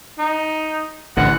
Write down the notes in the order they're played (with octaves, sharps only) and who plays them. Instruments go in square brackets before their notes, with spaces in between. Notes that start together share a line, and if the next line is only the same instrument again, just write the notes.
[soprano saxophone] D#4
[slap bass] A1 D3 [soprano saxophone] F#5